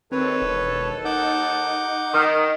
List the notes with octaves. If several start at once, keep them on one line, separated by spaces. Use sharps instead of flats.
D#2 C4 A4 B4 C#5
E1
D#4 F#5 D6 G6
D#3